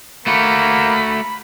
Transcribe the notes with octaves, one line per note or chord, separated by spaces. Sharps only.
A3 A#3 F#4 B5